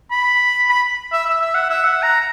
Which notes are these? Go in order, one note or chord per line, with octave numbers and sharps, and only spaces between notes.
B5
B5
E5
E5
E5
F#5
E5
F#5
A#5